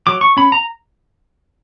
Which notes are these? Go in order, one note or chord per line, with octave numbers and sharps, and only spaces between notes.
F#3 D6
C#6
C#4 B5
A#5